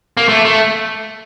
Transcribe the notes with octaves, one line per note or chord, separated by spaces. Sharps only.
A#3
A3
A3